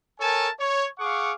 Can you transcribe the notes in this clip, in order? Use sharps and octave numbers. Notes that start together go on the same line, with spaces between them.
A4 A#4 C#5 G#5 A5
C#5
G#4 F5 F#5 C#6 D6